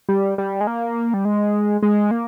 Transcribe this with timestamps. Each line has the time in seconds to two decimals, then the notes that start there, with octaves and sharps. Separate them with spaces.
0.09 G3
0.38 G3
0.61 G#3
0.67 A#3
1.14 G3
1.25 G#3
1.83 G#3
2.11 A#3